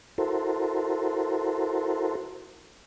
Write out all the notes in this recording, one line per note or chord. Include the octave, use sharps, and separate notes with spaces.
E4 F#4 A4 A#4 C5